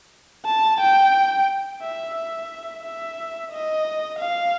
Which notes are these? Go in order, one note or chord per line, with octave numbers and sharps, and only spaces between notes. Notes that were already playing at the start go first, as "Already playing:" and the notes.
A5
G5
E5
E5
E5
D#5
F5